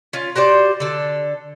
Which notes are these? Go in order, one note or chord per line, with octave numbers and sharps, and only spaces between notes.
C#4 F4
F#4 G4 C5 D5
D3 A4